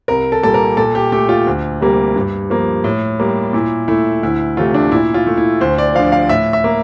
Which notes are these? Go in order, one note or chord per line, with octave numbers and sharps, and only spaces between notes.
C2 A#4
A4
A#2 G3 A#3 A4
A#4
A#2 A4
G4
A3 G4
F4
D2
C3 G3 A#3
G2
F3 A#3
A2
G3 A#3
A#2 E4
A3 E4
D2 E4
C3 E3 A3 F4
D4
A#2 E4
F4
A3
E4
D2 C5
D5
D3 F3 F5
F5
A2 E5
E5
A#3